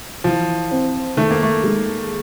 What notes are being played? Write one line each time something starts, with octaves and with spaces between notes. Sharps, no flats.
E3 F3
C4
D#3 A3
A#3
A3
G#3